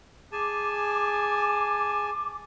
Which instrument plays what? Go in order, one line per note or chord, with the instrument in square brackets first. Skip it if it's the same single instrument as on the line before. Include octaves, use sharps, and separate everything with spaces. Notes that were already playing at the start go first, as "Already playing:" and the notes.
[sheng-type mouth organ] G#4 G#5 A5 [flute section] D6